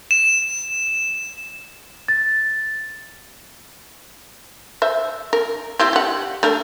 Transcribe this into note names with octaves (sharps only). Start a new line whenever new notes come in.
E7
A6
C5 E5
A#4
C4 E4 G4
G4 F#5
A3 D4 A#4